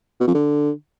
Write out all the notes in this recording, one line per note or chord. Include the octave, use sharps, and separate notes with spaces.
B2
F2
D3